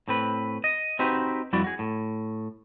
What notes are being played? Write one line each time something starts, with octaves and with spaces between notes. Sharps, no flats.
A2 C4 B4
D#5
C4 D#4 F#4 G4 B4
F2 G3 E4 F#4 D5
F#4 G#4
A2